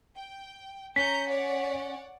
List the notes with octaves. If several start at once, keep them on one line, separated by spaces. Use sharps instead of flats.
G5
C#4 A#5 G6 B6 C#7
C#5 D5 F#5